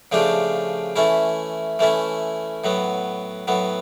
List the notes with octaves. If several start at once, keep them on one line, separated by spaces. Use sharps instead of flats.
C#3 F3 A3 D4 G4
E3 A3 C#4 E4
E3 A3 C#4 E4
A2 F#3 B3
A2 F#3 B3